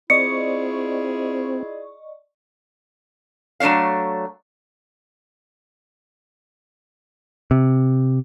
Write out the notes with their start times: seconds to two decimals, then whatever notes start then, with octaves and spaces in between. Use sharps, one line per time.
0.10 C4 E4 F4 G#4 D5 D#5 C#6 C#7
3.60 F#3 A3 D4 C#5 F5
7.51 C3